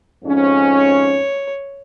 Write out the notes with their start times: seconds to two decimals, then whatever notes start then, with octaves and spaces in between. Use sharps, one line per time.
0.24 F2 G#2 C#4
0.76 C#5